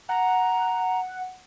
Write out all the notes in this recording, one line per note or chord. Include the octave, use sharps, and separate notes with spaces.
F#5 A#5